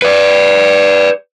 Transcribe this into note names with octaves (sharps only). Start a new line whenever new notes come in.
B4 D5